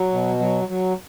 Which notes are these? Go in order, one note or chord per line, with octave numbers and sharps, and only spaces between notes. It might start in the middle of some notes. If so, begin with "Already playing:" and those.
Already playing: F#3
B2
F#3
F#3